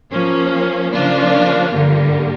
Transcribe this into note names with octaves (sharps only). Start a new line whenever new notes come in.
F3 A#3 C#4
C#3 F3 A#3 D4 F4
G2 D3 G3 A#3